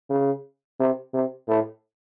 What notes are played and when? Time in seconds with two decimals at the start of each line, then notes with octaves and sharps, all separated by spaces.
0.10 C#3
0.79 C3
1.14 C3
1.48 A2